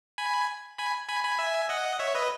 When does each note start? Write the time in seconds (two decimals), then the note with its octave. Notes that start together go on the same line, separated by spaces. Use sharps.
0.18 G#5 B5
0.78 G#5 B5
1.09 G#5 B5
1.24 G#5 B5
1.39 E5 G#5
1.69 D#5 F#5
1.99 C#5 E5
2.15 B4 D#5